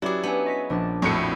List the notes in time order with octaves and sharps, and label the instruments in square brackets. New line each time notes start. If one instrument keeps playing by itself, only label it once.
[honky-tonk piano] F#3 [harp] C#4 [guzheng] E4 G#4 [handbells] G4 B4 D5
[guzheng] B3 [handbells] D4 G#5
[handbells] D#5 [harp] C#6 B6
[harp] A#1 D4 A5
[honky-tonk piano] F2 A2 C#7 [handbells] D4 C#6 [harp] E4 F#4 [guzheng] A#4